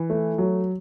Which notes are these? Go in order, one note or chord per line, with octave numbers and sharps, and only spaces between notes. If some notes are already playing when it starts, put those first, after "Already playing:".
Already playing: E3
A3
F#3